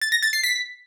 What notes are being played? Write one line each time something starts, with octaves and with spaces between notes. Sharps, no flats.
A6
A#6
A6
C7
B6